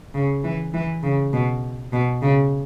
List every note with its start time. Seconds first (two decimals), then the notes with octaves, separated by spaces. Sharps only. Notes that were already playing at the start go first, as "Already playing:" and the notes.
0.14 C#3
0.44 E3
0.74 E3
1.03 C#3
1.33 B2
1.92 B2
2.22 C#3